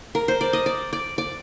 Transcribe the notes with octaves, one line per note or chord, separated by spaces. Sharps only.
A#4
C5
D5
D#5
D5
D5
D5